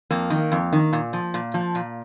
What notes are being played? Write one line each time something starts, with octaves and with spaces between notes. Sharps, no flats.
F2 A#3
D#3
F2
D#3
A#2
F3
A#2
F3
A#2